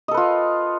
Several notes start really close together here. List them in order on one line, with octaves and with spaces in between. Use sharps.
D#5 A4 B4 F4